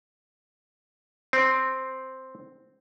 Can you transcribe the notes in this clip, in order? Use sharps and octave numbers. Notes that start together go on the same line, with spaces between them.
C4